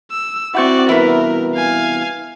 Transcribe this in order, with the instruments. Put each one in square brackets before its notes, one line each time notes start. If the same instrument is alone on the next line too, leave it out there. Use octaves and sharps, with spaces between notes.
[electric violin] E6
[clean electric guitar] C4 E4 [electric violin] F#4 D5 [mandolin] F#5 G5 C#6
[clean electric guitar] C2 B2 E3 [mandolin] E4 B4 [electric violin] A#4
[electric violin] F5 G#5